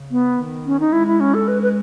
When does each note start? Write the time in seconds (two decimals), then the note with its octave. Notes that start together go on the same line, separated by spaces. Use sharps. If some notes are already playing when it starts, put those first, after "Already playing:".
Already playing: C#3
0.11 B3
0.39 D#3
0.66 C#4
0.80 D#4
0.93 G#3 E4
1.07 E4
1.20 C#4
1.34 A4
1.48 B4
1.62 B4